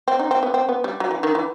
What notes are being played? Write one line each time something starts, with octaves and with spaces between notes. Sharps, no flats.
C4
D#4
C4
B3
C4
B3
G3
F#3
E3
D#3
E3